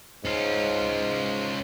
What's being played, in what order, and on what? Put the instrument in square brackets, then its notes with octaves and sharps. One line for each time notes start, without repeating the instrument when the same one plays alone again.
[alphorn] G#2 [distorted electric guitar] C#4 F4